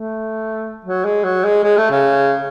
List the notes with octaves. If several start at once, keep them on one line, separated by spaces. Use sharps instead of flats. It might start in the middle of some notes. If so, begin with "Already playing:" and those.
Already playing: A3
F#3
G#3
F#3
G#3
G#3
A3
C#3